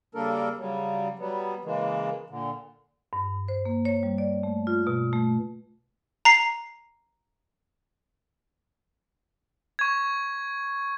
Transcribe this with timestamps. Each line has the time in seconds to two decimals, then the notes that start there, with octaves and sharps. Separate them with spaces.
0.15 C#3 G3 A#3 D4 A4 A#4
0.59 C#3 F#3 G3
1.19 F#3 G3 B3
1.65 C#3 E3 G#3 A#3
2.30 A#2 D3
3.13 G2
3.48 C5
3.65 A#3
3.85 C#5
4.03 G3
4.18 D5
4.43 A3
4.67 F4
4.87 B2
5.13 A3
6.25 A#5 C7
9.79 C#6 G#6